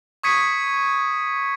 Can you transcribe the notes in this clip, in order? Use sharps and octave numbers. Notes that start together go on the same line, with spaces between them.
C#6 D#6 G#6 B6 C#7 D#7